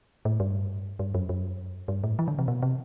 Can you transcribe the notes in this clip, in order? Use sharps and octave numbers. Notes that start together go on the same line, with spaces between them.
A2
G2
G2
F#2
F#2
G2
A2
E3
D3
C3
B2
C3